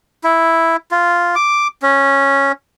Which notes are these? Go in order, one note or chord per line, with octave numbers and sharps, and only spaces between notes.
E4
F4
D6
C#4